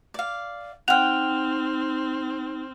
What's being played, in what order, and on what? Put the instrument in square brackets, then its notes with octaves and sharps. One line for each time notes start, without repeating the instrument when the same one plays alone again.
[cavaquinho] D5 F5
[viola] C4 [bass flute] D#4 [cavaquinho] F#5 G5 [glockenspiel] F6 F7